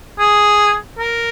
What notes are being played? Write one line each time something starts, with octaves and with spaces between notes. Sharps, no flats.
G#4
A#4